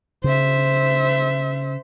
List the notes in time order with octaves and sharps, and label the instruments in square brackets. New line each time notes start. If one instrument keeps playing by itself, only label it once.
[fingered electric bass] C#3 [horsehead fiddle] C5 E5